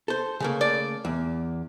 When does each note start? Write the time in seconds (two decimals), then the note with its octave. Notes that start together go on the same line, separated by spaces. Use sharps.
0.08 A4 C5
0.40 C#3 A3 A#3
0.61 D5
1.05 E2